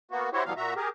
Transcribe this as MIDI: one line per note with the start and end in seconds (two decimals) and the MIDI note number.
0.11 0.29 58
0.11 0.29 59
0.11 0.29 66
0.33 0.44 64
0.33 0.44 66
0.33 0.44 67
0.33 0.44 72
0.33 0.44 73
0.46 0.53 47
0.46 0.53 52
0.46 0.53 54
0.46 0.53 55
0.46 0.53 59
0.46 0.53 77
0.57 0.74 46
0.57 0.74 66
0.57 0.74 76
0.57 0.74 82
0.76 0.89 67
0.76 0.89 68
0.76 0.89 70